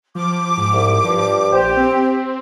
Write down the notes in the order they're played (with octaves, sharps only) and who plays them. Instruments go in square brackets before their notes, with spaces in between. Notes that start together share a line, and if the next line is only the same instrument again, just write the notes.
[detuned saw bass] F3 [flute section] D6
[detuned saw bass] G#2
[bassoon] C2
[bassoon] G2 [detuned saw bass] F3
[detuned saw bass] A#1 [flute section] G4 [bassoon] C5
[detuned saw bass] C4